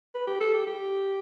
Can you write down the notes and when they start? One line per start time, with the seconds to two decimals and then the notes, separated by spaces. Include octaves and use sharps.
0.14 B4
0.27 G4
0.40 A4
0.54 G4
0.67 G4